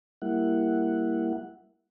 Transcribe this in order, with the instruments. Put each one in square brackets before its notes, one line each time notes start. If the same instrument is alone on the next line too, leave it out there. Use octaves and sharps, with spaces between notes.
[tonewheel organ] G3 A#3 E4 F#5